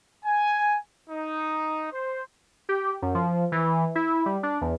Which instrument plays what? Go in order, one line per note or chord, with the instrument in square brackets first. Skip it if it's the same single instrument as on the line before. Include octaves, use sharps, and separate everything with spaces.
[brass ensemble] G#5
D#4
C5
[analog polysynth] G4
F#2
F3
E3
E4
G3
D4
E2